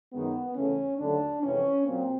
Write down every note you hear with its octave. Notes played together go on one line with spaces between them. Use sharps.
F#2 D#3 G#3 B3
E2 C#3 E3 A3 C#4
D#2 D3 F#3 A3 D4
F2 C3 E3 G#3 C#4
A#2 F#3 A#3 C4